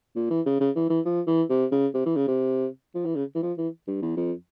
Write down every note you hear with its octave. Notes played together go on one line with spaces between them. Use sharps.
A#2
E3
C#3
C#3
E3
E3
F3
E3
C3
C#3
C3
E3
C#3
C3
F3
E3
C#3
E3
F3
E3
G2
E2
F2